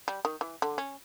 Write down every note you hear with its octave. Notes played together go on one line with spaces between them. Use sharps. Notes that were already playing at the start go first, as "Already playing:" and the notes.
G3
D#3
E3
D3
C#4